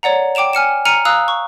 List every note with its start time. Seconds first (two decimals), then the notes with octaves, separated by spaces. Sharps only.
0.03 C#5 D5 F#5 A#5
0.35 G5 D6 D7 E7 F7
0.53 G#5 F6 C#7 E7
0.85 A#5 F6 C#7 D#7
1.05 F5 A#5 D#6 E6 F#6
1.28 C#6